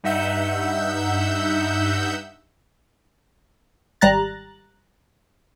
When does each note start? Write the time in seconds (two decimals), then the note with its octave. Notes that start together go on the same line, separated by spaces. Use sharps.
0.04 G2 D#4 E5 F#5 E6 G6
4.01 G#1 G3 A#5 F#6 A6